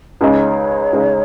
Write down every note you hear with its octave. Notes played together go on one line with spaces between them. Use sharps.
C#2 C#3 G#3 D#4 C#5
C#2 C#3 G#3 D#4